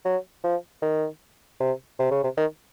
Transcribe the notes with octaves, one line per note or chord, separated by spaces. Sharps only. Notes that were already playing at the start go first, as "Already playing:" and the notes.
F#3
F3
D#3
C3
C3
C#3
C3
D#3